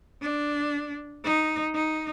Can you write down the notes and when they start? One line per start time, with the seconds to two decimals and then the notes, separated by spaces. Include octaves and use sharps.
0.22 D4
1.25 D#4
1.75 D#4